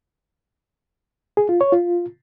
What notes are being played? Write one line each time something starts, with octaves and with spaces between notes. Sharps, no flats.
G#4
F4
C#5
F4